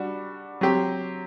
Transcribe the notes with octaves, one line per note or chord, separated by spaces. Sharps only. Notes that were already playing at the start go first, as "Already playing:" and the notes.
Already playing: G3 D4 F#4
F#3 C4 G4